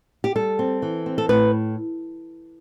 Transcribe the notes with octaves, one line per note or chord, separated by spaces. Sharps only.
G4
G3 A4
C4
E3
C4
A4
A2 B4